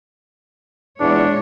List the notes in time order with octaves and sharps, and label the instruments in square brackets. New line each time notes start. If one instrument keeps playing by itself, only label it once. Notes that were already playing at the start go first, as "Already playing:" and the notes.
[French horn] E2 [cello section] A#2 G#3 C#5 [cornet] D4